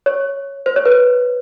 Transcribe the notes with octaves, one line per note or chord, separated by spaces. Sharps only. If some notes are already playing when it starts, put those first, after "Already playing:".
C#5
C5
C#5
B4